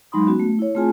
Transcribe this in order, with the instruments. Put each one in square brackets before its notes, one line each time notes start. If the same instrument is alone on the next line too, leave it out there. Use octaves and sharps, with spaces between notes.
[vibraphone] F#3 G#3 D#4 B5 C6 D#6
B3 C#4 F#4
A3
E4 C#5
A3 C4 F4 G#4 G#5 A5